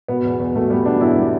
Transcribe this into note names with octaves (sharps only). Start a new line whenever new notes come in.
B2 B3
E2
E2
B2 A3
G3 B3
B2 D4
E2 E4
G3